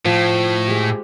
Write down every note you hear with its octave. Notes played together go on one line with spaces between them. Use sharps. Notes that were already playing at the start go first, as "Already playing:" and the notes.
A2 F3
G#3 G4